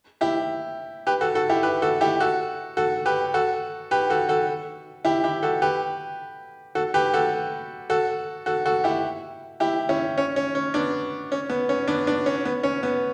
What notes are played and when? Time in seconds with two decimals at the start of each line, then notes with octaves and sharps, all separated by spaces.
0.21 E4 G4
1.07 G4 B4
1.21 F#4 A4
1.35 F#4 A4
1.49 E4 G4
1.63 G4 B4
1.82 F#4 A4
2.01 E4 G4
2.20 F#4 A4
2.77 F#4 A4
3.06 G4 B4
3.34 F#4 A4
3.91 G4 B4
4.10 F#4 A4
4.29 F#4 A4
5.05 E4 G4
5.24 E4 G4
5.43 F#4 A4
5.62 G4 B4
6.75 F#4 A4
6.94 G4 B4
7.14 F#4 A4
7.90 F#4 A4
8.46 F#4 A4
8.65 F#4 A4
8.84 E4 G4
9.60 E4 G4
9.89 C#4 E4
10.18 C#4
10.36 C#4
10.55 C#4
10.74 B3 D4
11.32 C#4
11.50 B3
11.69 C#4
11.88 B3 D4
12.07 B3 D4
12.26 C#4
12.45 B3
12.63 C#4
12.83 B3